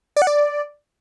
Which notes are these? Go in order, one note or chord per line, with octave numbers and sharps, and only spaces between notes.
D5
F#5
D5